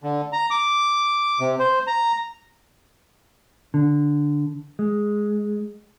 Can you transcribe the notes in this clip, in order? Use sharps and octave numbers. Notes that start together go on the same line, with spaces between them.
D3
A#5
D6
C3
C5
A#5
D3
G#3